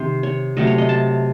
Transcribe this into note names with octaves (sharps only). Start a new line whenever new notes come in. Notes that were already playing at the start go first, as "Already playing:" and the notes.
Already playing: C3 D#3 C5
C#5
C3 F#3 A3 D#5
C#5
D#5
A5